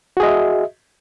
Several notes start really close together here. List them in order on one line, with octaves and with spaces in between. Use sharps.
F#4 G#4 D#5 E5